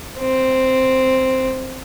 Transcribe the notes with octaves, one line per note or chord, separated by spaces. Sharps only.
C4